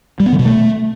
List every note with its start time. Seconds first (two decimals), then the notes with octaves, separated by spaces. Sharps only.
0.20 G3
0.26 B3
0.32 D3
0.39 B2
0.45 A3